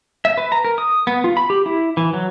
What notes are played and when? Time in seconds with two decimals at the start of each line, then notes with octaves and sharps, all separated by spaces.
0.25 E5
0.38 B4
0.52 A#5
0.65 A#4
0.78 D#6
1.07 B3
1.24 F4
1.37 B5
1.50 G4
1.66 E4
1.97 E3
2.14 F#3